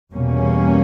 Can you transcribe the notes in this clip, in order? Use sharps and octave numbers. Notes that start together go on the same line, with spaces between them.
E2 B2 G3 A#3 C#4